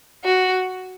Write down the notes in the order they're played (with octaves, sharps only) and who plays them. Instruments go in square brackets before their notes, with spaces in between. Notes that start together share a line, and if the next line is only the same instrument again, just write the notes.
[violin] F#4